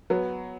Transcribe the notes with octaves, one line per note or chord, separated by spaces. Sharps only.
F#3 B3